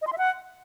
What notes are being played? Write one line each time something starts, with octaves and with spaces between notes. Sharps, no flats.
D#5
C6
E5
F#5